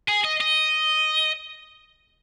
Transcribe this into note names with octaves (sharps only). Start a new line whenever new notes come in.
G#4
D#5
D#5